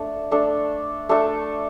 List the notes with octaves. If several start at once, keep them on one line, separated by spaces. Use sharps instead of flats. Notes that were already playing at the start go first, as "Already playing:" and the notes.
Already playing: A3 D4 A4
A3 D4 A4
A3 D4 A4